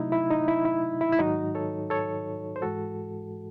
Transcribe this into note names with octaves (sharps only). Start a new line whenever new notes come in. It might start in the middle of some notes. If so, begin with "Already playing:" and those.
Already playing: C3 F#3 A3 D#4 E4
E4
D#4
E4
E4
E4
E4
G#2 D#3 F#3 D#4 F#4
A4 C#5
A4 C#5
C5
G#2 E3 G#3 F#4 A4